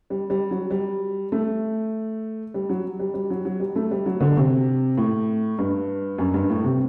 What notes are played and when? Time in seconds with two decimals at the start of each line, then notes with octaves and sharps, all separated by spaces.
0.10 G3
0.30 G3
0.51 F#3
0.71 G3
1.32 A3
2.54 G3
2.69 F#3
2.99 G3
3.14 G3
3.30 F#3
3.45 F#3
3.60 G3
3.76 A3
3.91 G3
4.06 F#3
4.20 D3
4.37 C3
4.98 A2
5.59 G2
6.18 F#2
6.34 G2
6.50 A2
6.64 C3